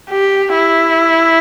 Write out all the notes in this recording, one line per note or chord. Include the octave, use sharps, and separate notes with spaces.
G4
E4